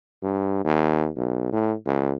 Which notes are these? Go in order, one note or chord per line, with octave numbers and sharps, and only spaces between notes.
G2
D#2
B1
A2
C#2